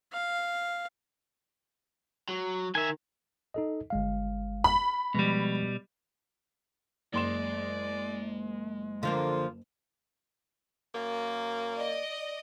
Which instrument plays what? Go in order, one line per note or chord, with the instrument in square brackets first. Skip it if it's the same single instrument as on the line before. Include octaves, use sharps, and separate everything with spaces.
[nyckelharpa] F5
[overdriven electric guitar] F#3
[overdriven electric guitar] D#3 [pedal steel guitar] E5 G#5
[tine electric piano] D#4 A4 D#5
G1 G#3 F5
[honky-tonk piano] B5
[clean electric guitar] B2 G3 [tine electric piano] F3 G#3
[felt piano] F#1 C6 E7 [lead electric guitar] G#3 [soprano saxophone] D5
[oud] D3 F3 A#3 [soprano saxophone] F4
[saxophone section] F#2 A#3
[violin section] D5 D#5